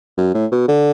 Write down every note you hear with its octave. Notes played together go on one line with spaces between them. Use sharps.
F#2
A2
B2
D3